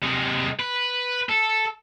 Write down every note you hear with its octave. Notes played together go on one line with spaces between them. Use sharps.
C3 G#3
B4
A4